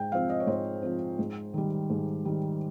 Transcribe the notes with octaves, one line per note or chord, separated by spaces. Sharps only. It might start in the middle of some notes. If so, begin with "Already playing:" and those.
Already playing: G#2 G5
F3 C4 F5
D#5
C#5
G#2 C5
F3 C4
G#2
D#3 G3
G#2
D#3 G3